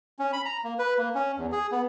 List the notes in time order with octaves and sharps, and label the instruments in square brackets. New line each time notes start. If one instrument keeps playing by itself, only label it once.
[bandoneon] C#4
B5
A#5
A#3
B4
A#3
C#4
E2
G#4
B3